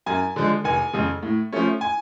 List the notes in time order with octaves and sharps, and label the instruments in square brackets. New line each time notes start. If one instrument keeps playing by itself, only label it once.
[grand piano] F#2 G#5
D3 F3 G#3
F1 G#5
F2 C#3
A2
F3 A3 C#4
G#5